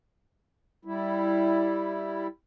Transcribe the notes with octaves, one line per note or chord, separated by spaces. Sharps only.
G3 E4